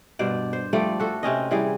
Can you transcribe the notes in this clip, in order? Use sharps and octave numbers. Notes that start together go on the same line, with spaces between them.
G2 B2 C5 D5
C5
F3 G3 A3 D5
F#4 A4
C3 C4 C#4 D#5
E3 G3 G#4